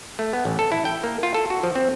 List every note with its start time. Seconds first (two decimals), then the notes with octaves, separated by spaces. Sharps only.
0.19 A3
0.33 B3
0.45 A1
0.59 A4
0.72 E4
0.85 G5
1.04 A#3
1.23 F4
1.34 A4
1.50 F#4
1.63 F3
1.75 C4